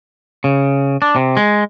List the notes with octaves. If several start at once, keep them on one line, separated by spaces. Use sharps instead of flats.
C#3
D4
C3
G#3